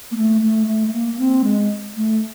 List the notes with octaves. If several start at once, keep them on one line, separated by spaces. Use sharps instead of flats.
A#3
A3
A3
A3
A3
A#3
C4
G#3
A3